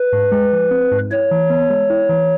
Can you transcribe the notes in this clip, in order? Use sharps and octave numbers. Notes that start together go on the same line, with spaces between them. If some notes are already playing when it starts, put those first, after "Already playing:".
Already playing: B4
G#2
G#3
F3
C4
G#2
E4 C#5
E3
B3
G#3
E4
E3